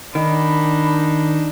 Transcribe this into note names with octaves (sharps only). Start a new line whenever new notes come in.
D#3 D4 D#4 B5